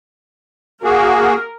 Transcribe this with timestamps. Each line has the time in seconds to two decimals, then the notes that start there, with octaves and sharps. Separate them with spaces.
0.83 A#3 F#4 G#4 A#4